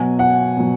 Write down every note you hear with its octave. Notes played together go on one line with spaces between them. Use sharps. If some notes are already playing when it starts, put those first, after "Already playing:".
Already playing: B2 F#3 G#5
F#5
B2 F#3